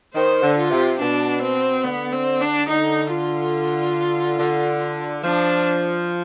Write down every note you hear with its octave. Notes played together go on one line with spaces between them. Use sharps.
D#3 C5
D3
F4
C3
B2 D4
C4
D3 B3
C4
D4
D3 D#4
F4
D3
F3 D4